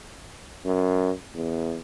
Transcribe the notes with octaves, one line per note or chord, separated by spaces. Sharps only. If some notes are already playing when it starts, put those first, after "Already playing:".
F#2
E2